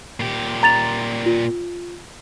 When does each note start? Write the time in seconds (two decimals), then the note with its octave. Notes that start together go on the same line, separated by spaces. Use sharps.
0.20 A#2 G4
0.63 A#5 A6 F7
1.26 F4